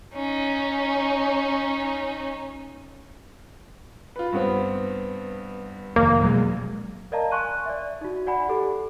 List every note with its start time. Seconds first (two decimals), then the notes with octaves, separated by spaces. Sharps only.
0.15 C#4 D#4
4.16 F4 B4
4.32 G2 B3 C4
5.96 F1 D#2 A#3
6.22 B2 F#3 G#3
7.12 A#4 D5 D#5 F5 A5 A#5
7.31 G#5 C6 C#6 F#6 D#7
7.66 D5 E5
8.01 D#4 F#4
8.27 D5 F#5 G#5 B5
8.49 G4 A4